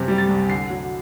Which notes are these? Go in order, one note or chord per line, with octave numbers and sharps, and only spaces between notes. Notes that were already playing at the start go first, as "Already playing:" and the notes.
Already playing: F#2 C3
G3
A6
C2
D3 C7
F#3